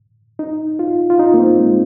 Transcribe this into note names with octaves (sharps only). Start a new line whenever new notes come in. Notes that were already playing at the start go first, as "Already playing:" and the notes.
D#4
F4
F4
D#4
A#3
C4
G#3